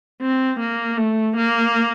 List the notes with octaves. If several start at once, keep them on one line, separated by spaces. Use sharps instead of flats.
C4
A#3
A3
A#3